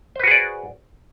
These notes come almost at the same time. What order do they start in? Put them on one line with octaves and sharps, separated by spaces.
C5 B4 F#4 G#4 D5